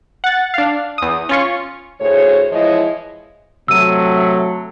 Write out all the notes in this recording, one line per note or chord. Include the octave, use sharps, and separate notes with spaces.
F#5 A6
D4 F5
E2 D#6
C#4 F4 C#6
D2 A2 G#4 C5 C#5
E3 F3 G#3 E4 C#5 D#5
C3 F#3 A3 E6 D#7